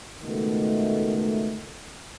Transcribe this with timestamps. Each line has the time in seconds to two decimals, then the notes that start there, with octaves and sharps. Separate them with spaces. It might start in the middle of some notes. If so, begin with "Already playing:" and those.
0.23 C#2 B2 D#3 A3